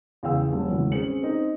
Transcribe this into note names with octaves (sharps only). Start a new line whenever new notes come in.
E2 C#3 G#4 F5 G5 E6
D#1 A#1
G#1 E2 C#3
C4 C#4 G#4 C#7 F#7
C4 D#4